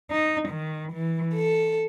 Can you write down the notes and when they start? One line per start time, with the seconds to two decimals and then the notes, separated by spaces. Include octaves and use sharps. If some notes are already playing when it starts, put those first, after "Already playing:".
0.10 D#4
0.48 D#3
0.93 E3
1.34 A4